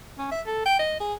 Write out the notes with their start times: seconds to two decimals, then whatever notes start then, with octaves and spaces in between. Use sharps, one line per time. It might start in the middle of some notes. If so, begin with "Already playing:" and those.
0.18 C#4
0.31 E5
0.47 A4
0.65 G5
0.79 D#5
1.00 G#4